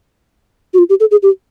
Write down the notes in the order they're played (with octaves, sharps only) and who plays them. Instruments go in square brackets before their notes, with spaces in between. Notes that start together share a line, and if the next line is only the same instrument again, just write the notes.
[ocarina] F#4
F4
G4
A4
G#4
G4